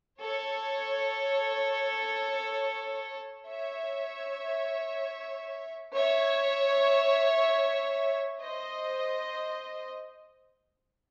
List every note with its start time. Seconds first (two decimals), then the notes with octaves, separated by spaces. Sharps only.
0.20 A4 C#5
3.48 C#5 E5
5.94 C#5 E5
8.40 C5 D#5